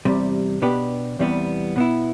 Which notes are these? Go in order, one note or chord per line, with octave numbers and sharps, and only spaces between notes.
E2 C3 G3
B2 B3 D4 G4 B4
E2 C3 E3 G3 B3
B2 B3 E4